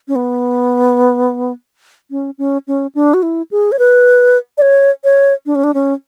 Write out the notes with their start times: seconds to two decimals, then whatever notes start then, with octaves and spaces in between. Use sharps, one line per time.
0.08 C#4
0.16 B3
2.11 C#4
2.38 C#4
2.67 C#4
2.95 D4
3.14 F#4
3.23 E4
3.51 G#4
3.72 C#5
3.79 B4
4.58 D5
4.62 C#5
5.04 C#5
5.46 D4
5.55 C#4
5.64 D4
5.74 C#4